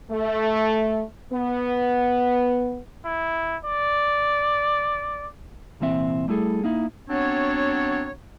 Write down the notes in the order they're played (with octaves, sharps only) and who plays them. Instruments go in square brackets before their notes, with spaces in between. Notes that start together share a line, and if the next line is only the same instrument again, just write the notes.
[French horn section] A3
B3
[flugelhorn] E4
D5
[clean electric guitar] C2 A#2 E3 C4 E5
G3 A3 E4 G#4 A4
A#3 D#4 E4
[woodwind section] F#3 B3 C4 D4 C#5